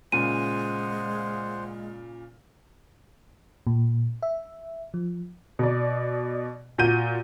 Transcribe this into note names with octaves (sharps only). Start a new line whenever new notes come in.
A#2 C#3 G#3 C5 F#5 D#7
A#2
E5
F3
B2 D5
A#2 F#4 G6 D#7